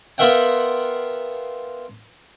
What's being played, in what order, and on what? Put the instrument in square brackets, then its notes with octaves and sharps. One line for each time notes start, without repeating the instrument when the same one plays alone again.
[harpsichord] B3 F4 A#4 E5 F#5 G5